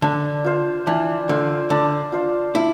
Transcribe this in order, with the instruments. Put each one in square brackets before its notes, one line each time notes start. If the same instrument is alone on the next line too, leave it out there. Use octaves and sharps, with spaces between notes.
[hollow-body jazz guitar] D3 [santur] D4
[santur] F4 C5 F5
[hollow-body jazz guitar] E3 [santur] D4
[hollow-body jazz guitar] D3 [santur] F4 C5 F5
[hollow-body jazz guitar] D3 [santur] D4
[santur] F4 C5 F5
[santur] D4 [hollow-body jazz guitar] E4